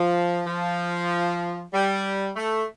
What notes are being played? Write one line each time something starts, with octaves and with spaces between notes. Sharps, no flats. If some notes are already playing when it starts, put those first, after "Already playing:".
Already playing: F3
F3
G3
A3